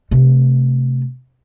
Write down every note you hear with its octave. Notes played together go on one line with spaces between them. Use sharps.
C3 A3